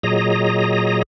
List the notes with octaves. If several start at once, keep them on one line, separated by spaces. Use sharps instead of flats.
A#2 F#3 G#4 D#5 A#5